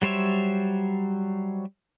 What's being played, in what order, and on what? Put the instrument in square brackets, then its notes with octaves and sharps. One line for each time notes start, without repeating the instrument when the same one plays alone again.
[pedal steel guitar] F#3 G3 C5 C#5 E5